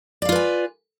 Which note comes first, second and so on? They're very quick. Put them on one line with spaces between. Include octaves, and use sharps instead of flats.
D5 F5 F4 B4 G#5